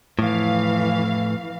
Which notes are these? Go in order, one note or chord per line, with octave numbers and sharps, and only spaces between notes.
F2 A2 E3 F5